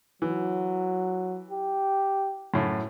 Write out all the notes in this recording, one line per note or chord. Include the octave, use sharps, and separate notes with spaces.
E3 F#3
G4
F#2 A2